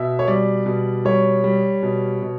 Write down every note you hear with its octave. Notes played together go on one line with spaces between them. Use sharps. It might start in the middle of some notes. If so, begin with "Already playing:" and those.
Already playing: B2 E5
C#5
G3 D5
B2
G3 C#5
G3
B2
B2